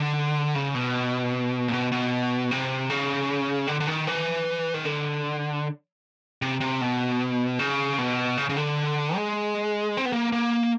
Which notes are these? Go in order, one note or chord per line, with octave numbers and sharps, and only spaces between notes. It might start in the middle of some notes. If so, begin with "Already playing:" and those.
Already playing: D3
C#3
B2
A#2
B2
B2
C3
C#3
D3
D3
D#3
E3
D#3
D3
C3
C3
B2
C#3
B2
C#3
C#3
D3
G#3
C4
B3
A#3
A#3